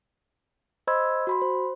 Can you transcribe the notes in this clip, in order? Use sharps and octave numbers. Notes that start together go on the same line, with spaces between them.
C5 D#5 B5 C6 E6 G#6
F#4 B5 C6
C5